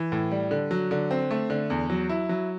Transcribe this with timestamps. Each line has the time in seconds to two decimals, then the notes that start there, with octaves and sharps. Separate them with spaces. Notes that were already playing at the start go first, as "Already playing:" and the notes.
Already playing: E3
0.12 A2
0.31 G3
0.51 D3
0.71 F#3
0.91 D3
1.11 C4
1.31 A3
1.50 D3
1.70 E2
1.90 F#3
2.09 E4
2.29 F#3